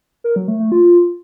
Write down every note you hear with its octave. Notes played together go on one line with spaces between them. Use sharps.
A#4
F#3
A3
A3
F4